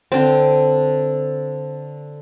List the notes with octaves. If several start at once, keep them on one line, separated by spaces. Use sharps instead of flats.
D3 C4